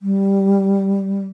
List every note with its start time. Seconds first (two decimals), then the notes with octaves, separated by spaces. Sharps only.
0.02 G3